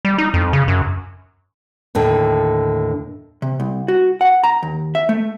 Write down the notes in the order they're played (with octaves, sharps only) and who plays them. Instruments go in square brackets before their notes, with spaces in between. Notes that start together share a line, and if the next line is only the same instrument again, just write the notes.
[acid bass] G3
D#4
F2
C#3
F#2
[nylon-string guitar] D#2 A2 D3 G5
[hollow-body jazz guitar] C3
C2
F#4
F#5
A#5
D#2
E5
A3